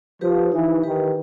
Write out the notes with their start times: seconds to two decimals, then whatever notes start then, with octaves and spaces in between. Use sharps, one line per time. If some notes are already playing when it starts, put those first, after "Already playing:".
0.21 F3 G4 B4
0.52 E3 D#4
0.83 D#3 G4 B4